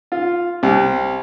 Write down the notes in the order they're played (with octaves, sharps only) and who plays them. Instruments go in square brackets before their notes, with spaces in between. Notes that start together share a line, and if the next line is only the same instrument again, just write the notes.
[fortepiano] F4
C2